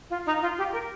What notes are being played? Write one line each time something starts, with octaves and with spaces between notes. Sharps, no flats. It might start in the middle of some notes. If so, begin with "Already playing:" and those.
F4
D#4
F4
G4
A#4